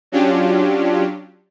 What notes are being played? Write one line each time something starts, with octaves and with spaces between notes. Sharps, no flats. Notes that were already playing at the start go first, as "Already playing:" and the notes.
F#3 C#4 D4 F4 G4